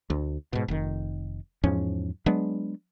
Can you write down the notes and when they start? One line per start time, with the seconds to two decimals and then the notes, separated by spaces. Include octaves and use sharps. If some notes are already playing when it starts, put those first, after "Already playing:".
0.10 D2
0.53 G#2 B2
0.68 F1 D#3
1.64 E2 G#2 F3 C#4
2.26 F#3 G#3 B3 D4